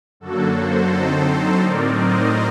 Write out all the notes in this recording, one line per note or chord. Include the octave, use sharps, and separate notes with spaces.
F#2 D3 F#3 A#3 F#4 A4
A4 C5
D3 F#3 C4 D#4 A4 C5
A2 F#3 C4 D#4 A#4 D5
C5 D#5